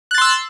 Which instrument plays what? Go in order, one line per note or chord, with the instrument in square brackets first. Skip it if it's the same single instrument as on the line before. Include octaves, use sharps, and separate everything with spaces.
[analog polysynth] F#6
A6
C6
E6